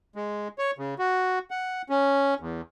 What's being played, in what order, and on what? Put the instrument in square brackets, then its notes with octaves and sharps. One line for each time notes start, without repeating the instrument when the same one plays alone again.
[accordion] G#3
C#5
C#3
F#4
F#5
C#4
E2